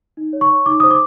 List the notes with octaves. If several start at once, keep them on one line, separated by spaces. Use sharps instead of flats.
D#4
C#5
C#6
C#5
D#4 D6
C5 D#6
D6